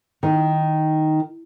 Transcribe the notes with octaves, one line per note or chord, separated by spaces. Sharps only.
D#3